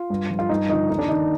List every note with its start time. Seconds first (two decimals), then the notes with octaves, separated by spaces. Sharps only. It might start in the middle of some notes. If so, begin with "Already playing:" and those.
Already playing: F4
0.10 G2
0.30 F3
0.39 F4
0.49 G2 D#4
0.69 D3 F3 D#4
0.89 D#2 D#4
0.99 D4
1.09 D#3 D#4